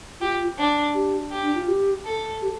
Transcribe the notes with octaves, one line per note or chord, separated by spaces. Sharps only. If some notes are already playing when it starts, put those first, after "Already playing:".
F4 G4
D4
G4
G4
D4
F4
G4
A4
G4